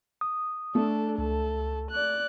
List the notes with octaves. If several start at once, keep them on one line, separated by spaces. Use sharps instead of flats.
D#6
A3 D4 A4
C#2 A4
D5 F#6